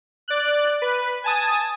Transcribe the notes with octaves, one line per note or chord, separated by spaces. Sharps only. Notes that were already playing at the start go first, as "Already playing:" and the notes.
D5 F#6
B4
G#5 A5 D#6